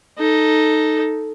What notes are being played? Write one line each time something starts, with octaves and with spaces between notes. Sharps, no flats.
D#4 A4